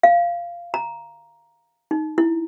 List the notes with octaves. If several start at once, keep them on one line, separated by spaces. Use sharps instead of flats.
F5
A#5
D#4
E4